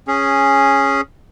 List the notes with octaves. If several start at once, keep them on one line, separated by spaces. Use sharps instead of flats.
C#4 G#4